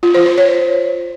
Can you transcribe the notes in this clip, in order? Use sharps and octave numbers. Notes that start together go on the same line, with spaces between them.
F4
C5
C5
C#5